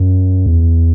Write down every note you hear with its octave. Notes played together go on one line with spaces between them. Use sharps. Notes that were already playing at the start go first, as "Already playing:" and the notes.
Already playing: F#2
E2